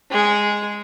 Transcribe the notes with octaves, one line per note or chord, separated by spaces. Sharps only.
G#3 G#4